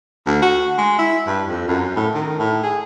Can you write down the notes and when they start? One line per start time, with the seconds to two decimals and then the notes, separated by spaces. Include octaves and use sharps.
0.26 D2
0.42 F#4
0.78 G#3
0.99 E4
1.27 G2
1.48 F2
1.68 F#2
1.96 A2
2.15 D#3
2.39 A2
2.63 G#4